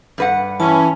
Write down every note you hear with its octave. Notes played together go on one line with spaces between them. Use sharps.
G2 B4 F#5
E3 C#4 A5